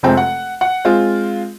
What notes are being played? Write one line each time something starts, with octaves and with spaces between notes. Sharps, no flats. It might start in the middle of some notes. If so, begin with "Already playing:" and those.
F1 C3 G#3 C4 G5
F#5
F#5
G#3 C4 F4